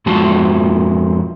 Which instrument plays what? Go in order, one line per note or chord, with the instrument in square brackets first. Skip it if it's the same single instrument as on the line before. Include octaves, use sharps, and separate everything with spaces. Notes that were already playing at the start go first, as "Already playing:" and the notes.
[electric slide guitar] F2 F3 G#3 F#4 A5